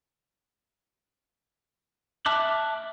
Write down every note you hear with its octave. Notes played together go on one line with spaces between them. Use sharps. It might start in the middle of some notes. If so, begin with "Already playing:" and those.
E5 A5 D6 F6 F#6